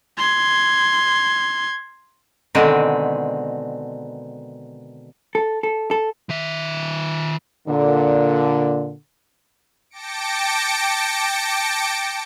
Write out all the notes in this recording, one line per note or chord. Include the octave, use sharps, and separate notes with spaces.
C6 G#6
B2 D3 D#3 G#3 C4
A4
A4
A4
D#3 E5
A#2 D3
G5 A5 D6 A#6 C#7 D7